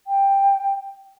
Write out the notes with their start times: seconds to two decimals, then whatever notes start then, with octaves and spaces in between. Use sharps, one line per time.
0.07 G5